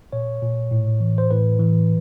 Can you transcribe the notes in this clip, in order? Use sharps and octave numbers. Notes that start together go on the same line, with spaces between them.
A#2 C#5
A#2
A2
E3
C5
A2 B4
E3